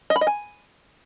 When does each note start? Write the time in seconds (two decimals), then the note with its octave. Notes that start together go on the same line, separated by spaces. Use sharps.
0.10 D#5
0.16 B5
0.21 D#5
0.27 G#5